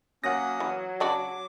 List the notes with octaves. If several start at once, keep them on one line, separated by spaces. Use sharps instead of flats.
F#3 A#3 C#4 F#5 D#6 A#6
E3
C#3 D4 F#4 D6